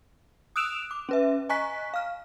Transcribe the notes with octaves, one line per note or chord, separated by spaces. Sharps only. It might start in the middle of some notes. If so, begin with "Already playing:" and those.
D#6 E6 F#6 D7 E7 F7
D6
C#4 B4 E5
D#5 G#5 A#5 C#6 F#6 B6
F5 F6